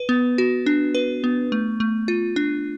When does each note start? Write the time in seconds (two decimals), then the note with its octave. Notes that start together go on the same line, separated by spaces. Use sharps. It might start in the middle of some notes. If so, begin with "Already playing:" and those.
Already playing: B4
0.09 B3
0.38 F#4
0.66 D4
0.95 B4
1.24 B3
1.52 A3
1.80 A3
2.08 F4
2.36 D4